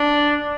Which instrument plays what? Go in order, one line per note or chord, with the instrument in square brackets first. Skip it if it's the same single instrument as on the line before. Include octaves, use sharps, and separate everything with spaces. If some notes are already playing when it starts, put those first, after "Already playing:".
Already playing: [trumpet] D4